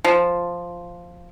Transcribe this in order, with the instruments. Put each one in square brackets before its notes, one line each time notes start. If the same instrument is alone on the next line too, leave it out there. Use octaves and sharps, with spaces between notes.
[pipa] F3